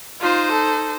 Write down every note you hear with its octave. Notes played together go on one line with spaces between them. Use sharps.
D#4 F4 C5
A4